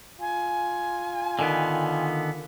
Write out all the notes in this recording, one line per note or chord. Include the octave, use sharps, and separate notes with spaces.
F4 G#5
D3 D#3 B3